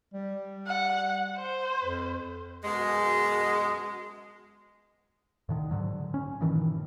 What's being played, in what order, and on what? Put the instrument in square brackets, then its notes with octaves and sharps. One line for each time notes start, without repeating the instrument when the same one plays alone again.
[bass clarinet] G3
[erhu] F#5
C5
[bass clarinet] F2
[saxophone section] F#2 B2 G#3
[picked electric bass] A2 D3 D#3
G#2 D3 F#3
C#4
G2 A#2 D#3 E3